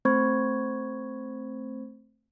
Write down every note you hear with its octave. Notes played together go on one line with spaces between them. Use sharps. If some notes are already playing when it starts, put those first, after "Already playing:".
A3 C4 C5 B5 C#6 G#6